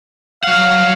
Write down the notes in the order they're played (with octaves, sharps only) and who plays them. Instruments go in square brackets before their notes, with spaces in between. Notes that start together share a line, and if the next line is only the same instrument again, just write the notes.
[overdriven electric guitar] F#3 F#5 [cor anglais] F5